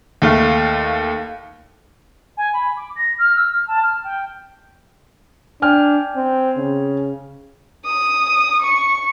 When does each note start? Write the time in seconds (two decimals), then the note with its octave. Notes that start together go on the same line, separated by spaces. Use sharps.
0.22 D#2 A3 F5
2.37 G#5
2.53 B5
2.76 D6
2.96 A#6
3.18 F6
3.36 E6
3.51 F6
3.67 A5
3.82 F6
4.03 G5
5.62 D4 G5 G#5 F6
6.16 C4
6.57 C#3
7.85 D#6
8.61 C#6